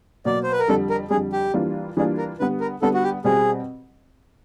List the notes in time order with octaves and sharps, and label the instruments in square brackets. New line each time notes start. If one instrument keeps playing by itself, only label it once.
[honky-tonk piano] B2 F#3 A#3 [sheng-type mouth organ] D5
[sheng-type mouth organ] C5
B4
A#4
[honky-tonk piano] F2 D3 G3 [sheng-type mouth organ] A4
[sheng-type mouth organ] A#4
[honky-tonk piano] F2 D3 G3 [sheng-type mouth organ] G#4
[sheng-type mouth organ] G4
[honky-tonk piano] E3 G3 A#3 D4 F4
[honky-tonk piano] E3 G3 A#3 D4 F4 [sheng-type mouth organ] G#4
[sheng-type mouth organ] A#4
[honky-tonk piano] D3 G3 B3 [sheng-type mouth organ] B4
[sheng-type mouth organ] A#4
[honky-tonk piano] D3 G3 B3 [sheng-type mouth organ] A4
[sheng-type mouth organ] F#4
G4
[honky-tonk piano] B2 G3 C4 [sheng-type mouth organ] G#4